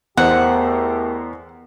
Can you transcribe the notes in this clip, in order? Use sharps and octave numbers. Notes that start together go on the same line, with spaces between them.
E2 A3 B3 G4 A#4 C5 D#5 F#5